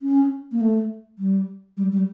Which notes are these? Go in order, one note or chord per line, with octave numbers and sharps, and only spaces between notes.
C#4
A#3
A3
G3
G3
G3